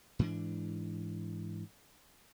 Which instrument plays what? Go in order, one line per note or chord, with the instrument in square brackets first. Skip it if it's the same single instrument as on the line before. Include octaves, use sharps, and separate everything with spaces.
[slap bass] G#2 E3 D4